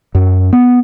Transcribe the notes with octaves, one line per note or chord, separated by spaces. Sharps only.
F#2
B3